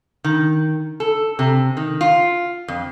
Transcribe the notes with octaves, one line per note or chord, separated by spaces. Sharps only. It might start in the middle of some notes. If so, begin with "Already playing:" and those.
D#3
A4
C3
D#3
F4
F2